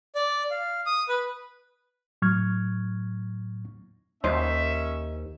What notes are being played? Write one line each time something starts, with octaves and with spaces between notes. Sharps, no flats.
D5
F5
D#6
B4
A2 F#3 C#6 F6 G#6
D#2 C#4 D#4 C5 E5